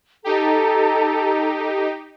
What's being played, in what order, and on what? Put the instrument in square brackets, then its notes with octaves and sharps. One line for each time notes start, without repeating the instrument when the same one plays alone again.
[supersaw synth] D#4 G4 [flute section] A4 A#5